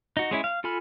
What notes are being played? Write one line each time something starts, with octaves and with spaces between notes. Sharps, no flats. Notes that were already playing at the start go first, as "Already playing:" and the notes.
D#4 F#4
G#3 C#4 E4
F5
F4 A4 G#5 B5 F6